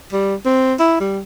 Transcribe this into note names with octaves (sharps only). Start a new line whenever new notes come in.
G3
C4
E4
G3